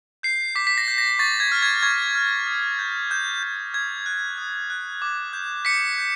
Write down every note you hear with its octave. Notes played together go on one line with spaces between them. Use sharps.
G6 C7
D6 B6
B6
A#6
G6
A#6
C#6 A6
G#6
F6
G#6
C#6 G#6
F6
D#6
G6
D#6 G6
G6
D#6 G#6
F#6
D#6
F#6
D6
G6
D6 B6 C#7
G6